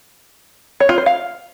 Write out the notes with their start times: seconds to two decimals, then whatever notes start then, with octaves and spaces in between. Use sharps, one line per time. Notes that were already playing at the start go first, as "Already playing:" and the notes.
0.80 C#5
0.89 F4
0.98 C5
1.06 F5